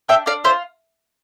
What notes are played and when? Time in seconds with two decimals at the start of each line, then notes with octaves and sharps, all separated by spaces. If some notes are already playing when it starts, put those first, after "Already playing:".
0.08 D4 E5 G5
0.26 D4 D5 F5
0.44 F4 C5 E5